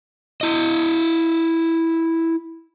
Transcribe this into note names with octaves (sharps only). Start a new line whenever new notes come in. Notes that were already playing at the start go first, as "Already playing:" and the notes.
E4 D#5